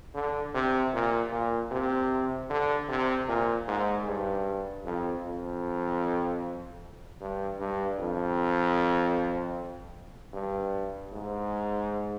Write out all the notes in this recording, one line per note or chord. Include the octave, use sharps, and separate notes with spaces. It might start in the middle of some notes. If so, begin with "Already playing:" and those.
D3
C3
A#2
A#2
C3
D3
C3
A#2
G#2
G2
F2
F2
G2
G2
F2
G2
G#2